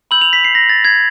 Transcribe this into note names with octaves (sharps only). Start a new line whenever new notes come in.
B5 E6 G6 F#7
F7
B6
C7
A#6
A6
G#6